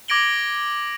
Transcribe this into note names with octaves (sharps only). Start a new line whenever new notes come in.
D6 G#6 A#6 D7 F#7 G7